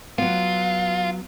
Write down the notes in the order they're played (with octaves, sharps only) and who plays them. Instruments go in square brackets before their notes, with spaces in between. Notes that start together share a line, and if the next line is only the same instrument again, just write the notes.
[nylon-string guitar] F#3 B3 [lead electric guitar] F4